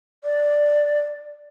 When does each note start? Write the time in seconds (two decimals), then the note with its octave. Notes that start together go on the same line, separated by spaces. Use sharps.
0.24 D5